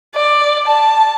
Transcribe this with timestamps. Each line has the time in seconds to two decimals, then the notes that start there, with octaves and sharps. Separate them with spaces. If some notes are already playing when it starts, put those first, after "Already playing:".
0.15 D5
0.67 A5